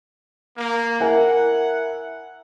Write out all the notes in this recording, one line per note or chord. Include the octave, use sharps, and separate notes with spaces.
A#3
E4 A#4 F#5 G#5